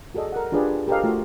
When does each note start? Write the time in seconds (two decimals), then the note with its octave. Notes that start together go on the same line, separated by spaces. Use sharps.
0.15 F#4 G#4 A4 D5 D#5
0.32 A#4 F#5
0.52 D4 F4 G4 G#4 B4 D5
0.88 G4 A4 A#4 C5 D#5 F5
1.04 A3 F4 F#4